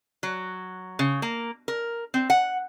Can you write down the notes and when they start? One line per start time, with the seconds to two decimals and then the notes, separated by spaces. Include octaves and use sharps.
0.23 F#3
0.99 C#3
1.22 A#3
1.68 A#4
2.14 C4
2.30 F#5